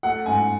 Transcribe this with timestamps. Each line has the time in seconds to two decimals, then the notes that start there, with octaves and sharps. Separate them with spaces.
0.03 A3 F#5
0.26 G#2 G#5